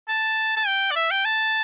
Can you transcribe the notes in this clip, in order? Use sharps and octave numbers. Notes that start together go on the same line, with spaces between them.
A5
A5
G5
D5
E5
G5
A5